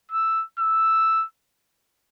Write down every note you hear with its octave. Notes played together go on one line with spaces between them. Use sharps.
E6
E6